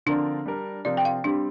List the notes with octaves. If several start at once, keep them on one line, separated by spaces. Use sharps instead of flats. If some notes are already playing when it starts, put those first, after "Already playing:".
D3 F3 C4 D4 A#4 D5
G3 D4 A#4 D5
C3 F3 C4 A#4 D5
G5
F5
G3 C4 D4 G4